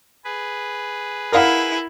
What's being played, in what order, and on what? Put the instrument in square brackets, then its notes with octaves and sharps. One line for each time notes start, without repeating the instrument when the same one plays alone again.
[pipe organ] G#4 B4
[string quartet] E4 [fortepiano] A#4 F5 F#5